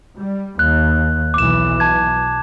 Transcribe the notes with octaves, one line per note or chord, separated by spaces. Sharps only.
G3
D#2 F#6
B1 E3 D6 E7
A5 G#6